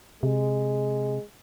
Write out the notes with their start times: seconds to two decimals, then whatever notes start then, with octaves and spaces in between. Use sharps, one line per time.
0.23 C3 G#3